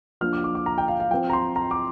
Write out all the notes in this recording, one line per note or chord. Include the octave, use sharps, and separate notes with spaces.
F3 A#3 D4 F6
D6
D6
D6
A#5
G5
F5
F5
F3 C4 G5
A#5
C6
A#5
D6